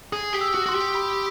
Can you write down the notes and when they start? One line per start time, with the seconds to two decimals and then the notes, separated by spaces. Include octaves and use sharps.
0.12 G#4 D#6
0.33 G4
0.41 E6
0.54 F#4
0.66 F#4 C6
0.75 G4
0.95 B5